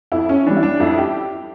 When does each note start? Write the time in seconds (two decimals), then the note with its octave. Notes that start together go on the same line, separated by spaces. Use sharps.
0.12 F2 E4
0.29 C#4
0.46 E3 G3 D4
0.57 E4
0.63 D4
0.80 F2 E4
0.98 G4